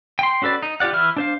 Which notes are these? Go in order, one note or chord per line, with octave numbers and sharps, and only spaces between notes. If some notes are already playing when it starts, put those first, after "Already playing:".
G5 C6
C#4 F#4 A4 B4 D5
D#4
F4 G4 D5 F#5
E3 E4 F6
D4 C5 F5